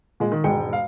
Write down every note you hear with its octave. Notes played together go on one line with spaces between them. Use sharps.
A#2 G#3
D#3
E1 G#2 G#3 G5 C#7
F5